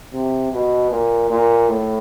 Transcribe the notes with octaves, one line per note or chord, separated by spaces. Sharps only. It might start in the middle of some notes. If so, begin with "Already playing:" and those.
C3
B2
A#2
A#2
A2